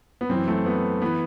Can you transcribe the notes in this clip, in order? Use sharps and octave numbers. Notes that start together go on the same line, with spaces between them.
B3
F#2 E3 C4
A3
B3
E3 B3